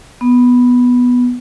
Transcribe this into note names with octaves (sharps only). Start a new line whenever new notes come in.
B3